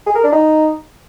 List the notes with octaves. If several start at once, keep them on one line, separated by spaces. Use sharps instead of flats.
G#4
A#4
D4
D#4